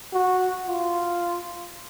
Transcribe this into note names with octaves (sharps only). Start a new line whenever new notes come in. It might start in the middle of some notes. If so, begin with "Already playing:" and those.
F#4
F4